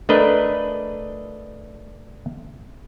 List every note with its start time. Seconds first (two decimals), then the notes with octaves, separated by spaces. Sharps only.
0.09 A3 D4 A#4 B4 D#5